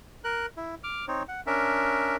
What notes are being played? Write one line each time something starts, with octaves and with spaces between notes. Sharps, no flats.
A#4 F#6
E4
D6 F6
C4 D#4 C#5
F#5
C#4 D4 A#4 E5